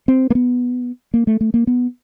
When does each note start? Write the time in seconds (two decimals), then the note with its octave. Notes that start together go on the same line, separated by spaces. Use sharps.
0.08 C4
0.30 A#3
0.35 B3
1.14 A#3
1.27 A3
1.41 A3
1.54 A#3
1.67 B3